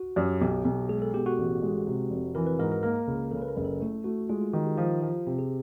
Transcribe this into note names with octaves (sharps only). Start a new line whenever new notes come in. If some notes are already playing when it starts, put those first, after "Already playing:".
Already playing: F#4
F#2 G4
B1 G4
B1
G#3 G#4
A4
B2 G4
F#4
A1
G#3
C3
F1
E3 A#4
B4
G#2 A#4
A#4
A#3 A#4
C#2
C#3 A4
B4
A#4
F#1
A4
A3 E4
A3 F#4
G#3 F4
F4
D#3 F#4
G4
F3
F3
C3 G4
G#4